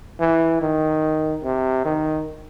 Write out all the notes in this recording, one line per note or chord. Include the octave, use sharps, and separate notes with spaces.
E3
D#3
C3
D#3